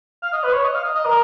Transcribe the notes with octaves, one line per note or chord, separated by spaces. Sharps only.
F5
D#5
B4
C#5
D#5
F5
D#5
D#5
A#4